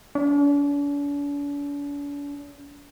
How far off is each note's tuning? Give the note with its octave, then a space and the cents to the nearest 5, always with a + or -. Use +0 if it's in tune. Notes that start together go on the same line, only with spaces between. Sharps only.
D4 -45